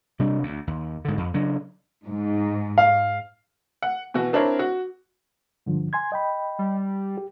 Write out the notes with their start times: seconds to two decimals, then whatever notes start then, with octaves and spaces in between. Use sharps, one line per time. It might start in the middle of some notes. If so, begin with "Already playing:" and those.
0.19 C3 G3 D4
0.43 D2
0.67 D#2
1.05 G#2 D3
1.17 F2
1.34 C#3 F#3 D4
2.06 G#2
2.78 F5
3.82 F#5
4.14 B2 E3 F#4
4.33 C4 D4 E4 A#4 C#5
4.59 F#4
5.66 G2 D3 F3
5.93 G#5 C6 G#6
6.12 D#5 G5 B5
6.59 G3
7.18 G4